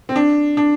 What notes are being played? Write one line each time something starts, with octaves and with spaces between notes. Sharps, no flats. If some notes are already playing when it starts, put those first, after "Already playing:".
C4
D4
D4